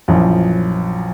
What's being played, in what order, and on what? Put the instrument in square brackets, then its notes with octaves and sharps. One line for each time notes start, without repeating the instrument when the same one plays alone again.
[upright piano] A#1 F#2 E3 F3